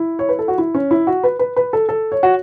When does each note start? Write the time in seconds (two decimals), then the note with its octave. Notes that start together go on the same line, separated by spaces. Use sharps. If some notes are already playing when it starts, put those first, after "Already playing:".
Already playing: E4
0.19 C#5
0.29 B4
0.39 A4
0.48 F#4
0.58 E4
0.74 C#4
0.91 E4
1.07 F#4
1.24 B4
1.39 B4
1.56 B4
1.73 A4
1.89 A4
2.12 C#5
2.23 F#4